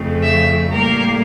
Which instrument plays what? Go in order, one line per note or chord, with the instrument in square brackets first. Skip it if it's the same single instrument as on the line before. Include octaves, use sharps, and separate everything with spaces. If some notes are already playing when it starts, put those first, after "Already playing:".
Already playing: [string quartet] F2 C#3 F3 A3
E5
A2 G3 A#3 A#4